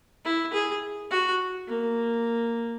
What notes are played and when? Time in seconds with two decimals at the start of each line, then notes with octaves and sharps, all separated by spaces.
0.25 E4
0.53 G#4
1.11 F#4
1.68 A#3